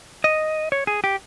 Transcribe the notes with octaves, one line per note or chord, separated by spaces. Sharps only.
D#5
C#5
G#4
G4